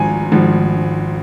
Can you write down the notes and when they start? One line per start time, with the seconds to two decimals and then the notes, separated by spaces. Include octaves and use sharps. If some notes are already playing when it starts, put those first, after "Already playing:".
Already playing: G#1 G#2 F3 G#5
0.32 G#1 G#2 F3